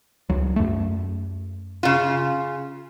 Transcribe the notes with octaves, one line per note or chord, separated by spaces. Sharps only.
C#2 F#3
F#2 A3
C#3 F4